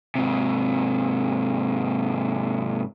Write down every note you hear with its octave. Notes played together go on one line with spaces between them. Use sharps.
G#2 C3